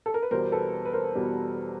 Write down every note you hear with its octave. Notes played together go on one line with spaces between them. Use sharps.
A4
A#4
B4
E2 B2 G3 A#4 C5
A4 B4
B4
A#4 C5
E2 B2 G3